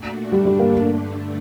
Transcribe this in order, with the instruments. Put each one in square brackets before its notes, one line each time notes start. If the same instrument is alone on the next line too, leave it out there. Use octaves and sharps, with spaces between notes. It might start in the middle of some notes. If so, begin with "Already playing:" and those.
Already playing: [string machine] A#2 A3 D4 F#4
[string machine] G2 D3 A3 D4 [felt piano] G3
[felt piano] G3
A#3